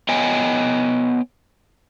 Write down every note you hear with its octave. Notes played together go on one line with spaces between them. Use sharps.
B3 C#5 D#5 G5 G#5